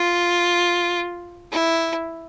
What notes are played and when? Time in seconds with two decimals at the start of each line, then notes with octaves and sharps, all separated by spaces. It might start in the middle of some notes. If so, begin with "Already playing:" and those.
Already playing: F4
1.52 E4